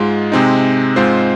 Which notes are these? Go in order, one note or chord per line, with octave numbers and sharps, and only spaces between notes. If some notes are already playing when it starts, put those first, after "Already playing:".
Already playing: G#2 G#3 F4
C3 G#3 C4 D#4
G#2 G#3 C4 F4 C5